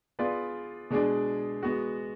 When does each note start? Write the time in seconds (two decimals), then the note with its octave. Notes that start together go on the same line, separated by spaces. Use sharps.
0.19 B3 F4 G#4 B4 D5
0.90 B2 G#3 D4 G#4 D5
1.63 G#3 B3 F#4